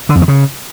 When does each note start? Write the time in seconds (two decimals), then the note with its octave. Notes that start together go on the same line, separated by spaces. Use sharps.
0.09 D3
0.16 F2
0.22 D#3
0.28 C#3